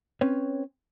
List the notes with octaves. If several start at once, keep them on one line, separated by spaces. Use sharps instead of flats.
C4 C#4 B4 C#5